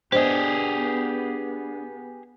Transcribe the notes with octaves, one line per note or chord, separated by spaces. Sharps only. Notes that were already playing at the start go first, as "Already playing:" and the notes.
B3 D4 G4 G#4 C5 D#5